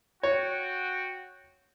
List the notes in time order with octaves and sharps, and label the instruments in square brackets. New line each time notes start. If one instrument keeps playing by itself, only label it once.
[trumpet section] F#4 G5 [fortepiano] C#5